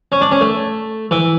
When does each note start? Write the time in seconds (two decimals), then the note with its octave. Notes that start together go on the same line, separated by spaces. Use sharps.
0.12 C#4
0.21 D4
0.32 C#4
0.41 A3
1.11 E3